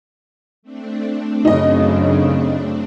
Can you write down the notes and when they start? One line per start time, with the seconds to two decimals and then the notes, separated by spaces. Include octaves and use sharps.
0.63 A3 C4 D4
1.45 F#2 C#3 D#4 D#5